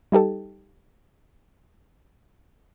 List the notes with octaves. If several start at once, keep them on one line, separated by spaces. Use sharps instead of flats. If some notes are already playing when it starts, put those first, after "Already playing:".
G3 D#4 G4 A4